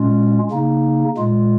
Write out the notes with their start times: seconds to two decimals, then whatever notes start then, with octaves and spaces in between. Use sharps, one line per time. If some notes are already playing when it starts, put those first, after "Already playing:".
Already playing: A#2 G#3 C#4 F4
0.51 C#3 A#3 D#4
1.17 A#2 G#3 F4